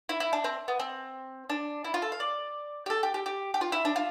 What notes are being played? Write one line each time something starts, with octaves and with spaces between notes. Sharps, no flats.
E4
E4
D4
C4
B3
C4
D4
E4
F4
A4
F5
D5
G4
A4
G4
G4
G4
G4
F4
E4
D4
F4